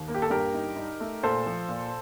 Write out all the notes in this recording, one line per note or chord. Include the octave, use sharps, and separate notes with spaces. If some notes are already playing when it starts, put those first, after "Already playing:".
Already playing: D#2
A#3
G4
A4
G2 G4 A#4
D#4
D#4
A3
A#2 A4 C5
F3
A#2